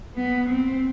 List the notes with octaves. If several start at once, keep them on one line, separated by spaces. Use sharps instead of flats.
B3
C4